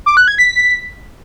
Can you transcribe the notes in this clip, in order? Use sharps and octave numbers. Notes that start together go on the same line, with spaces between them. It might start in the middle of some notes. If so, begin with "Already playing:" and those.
D6
F#6
G#6
B6